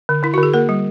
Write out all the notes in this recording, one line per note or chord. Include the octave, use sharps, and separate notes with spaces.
D3
D3 E4
D3 F#4
G#4
A#3 A#4
G3